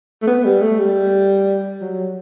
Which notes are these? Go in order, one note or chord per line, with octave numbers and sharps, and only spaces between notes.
A3
B3
G3
A3
G3
F#3